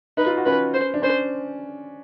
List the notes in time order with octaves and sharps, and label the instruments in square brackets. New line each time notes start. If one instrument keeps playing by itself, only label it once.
[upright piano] D#4 [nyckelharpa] B4
[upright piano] F4
F#4
[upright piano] C#4 [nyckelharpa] B4
[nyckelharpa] C5
[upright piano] D4
[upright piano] C#4 [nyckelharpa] C5